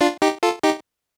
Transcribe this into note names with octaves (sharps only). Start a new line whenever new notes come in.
D4 F4
D#4 G4
F4 A4
D#4 G4